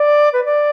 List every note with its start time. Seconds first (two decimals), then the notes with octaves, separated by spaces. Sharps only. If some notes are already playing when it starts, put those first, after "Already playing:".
Already playing: D5
0.33 B4
0.44 D5